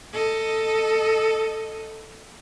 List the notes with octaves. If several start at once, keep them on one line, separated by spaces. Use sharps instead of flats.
A4 D#5